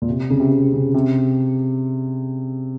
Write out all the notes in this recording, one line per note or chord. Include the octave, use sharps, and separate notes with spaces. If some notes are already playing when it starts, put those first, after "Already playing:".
A#2
C3
C#3
C3
C3
C#3
C3